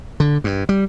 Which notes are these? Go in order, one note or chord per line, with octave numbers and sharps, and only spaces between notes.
D3
G2
G3